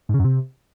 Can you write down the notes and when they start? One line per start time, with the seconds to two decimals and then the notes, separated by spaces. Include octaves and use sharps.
0.09 G#2
0.14 C#3
0.19 F#2
0.25 C3